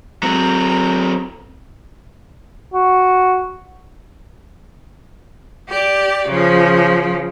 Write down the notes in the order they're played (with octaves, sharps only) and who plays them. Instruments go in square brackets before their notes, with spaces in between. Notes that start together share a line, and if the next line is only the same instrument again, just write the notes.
[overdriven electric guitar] F#3 C4 [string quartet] A#5
[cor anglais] F#4
[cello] G4 D5
C#3 F3